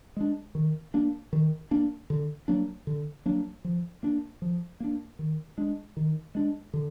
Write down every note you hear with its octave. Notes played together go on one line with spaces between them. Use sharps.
G#3 D4
D#3
A#3 D4
D#3
A#3 D4
D3
F#3 A#3 D4
D3
F#3 A#3 D4
F3
A#3 D4
F3
A#3 D4
D#3
G#3 D4
D#3
G#3 D4
D3